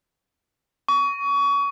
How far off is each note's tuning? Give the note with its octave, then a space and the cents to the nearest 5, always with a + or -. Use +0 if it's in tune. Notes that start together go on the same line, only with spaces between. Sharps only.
C#6 +30